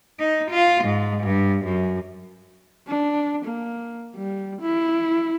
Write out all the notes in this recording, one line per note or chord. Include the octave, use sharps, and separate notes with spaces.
D#4
F4
G#2
G2
F#2
D4
A#3
G3
E4